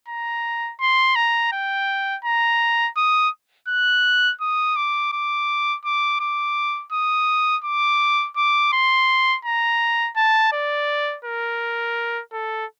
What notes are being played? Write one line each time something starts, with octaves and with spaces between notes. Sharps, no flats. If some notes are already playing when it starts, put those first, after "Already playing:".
A#5
C6
A#5
G5
A#5
D#6
F#6
D#6
D6
D6
D6
D6
D#6
D6
D6
C6
A#5
A5
D5
A#4
A4